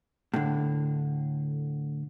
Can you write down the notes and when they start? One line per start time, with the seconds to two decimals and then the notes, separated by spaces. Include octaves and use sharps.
0.34 A2 D3